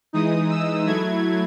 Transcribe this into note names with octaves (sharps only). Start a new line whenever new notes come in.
E3 G#3 D#4 D#6
E6
F#3 A3 E4 G#6